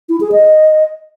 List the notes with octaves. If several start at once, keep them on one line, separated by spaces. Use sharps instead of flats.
E4
G#4
D#5